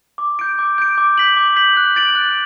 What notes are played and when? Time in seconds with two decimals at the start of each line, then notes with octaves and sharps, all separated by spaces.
0.18 D6
0.39 G6 D7
0.59 D6
0.78 G6 D7
0.98 D6
1.18 G6 B6 F#7
1.37 D6
1.56 G6 B6 F#7
1.77 F#6
1.96 A6 D7 F#7
2.15 F#6